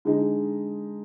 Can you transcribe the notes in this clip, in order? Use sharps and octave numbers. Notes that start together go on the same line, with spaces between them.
D3 G#3 D#4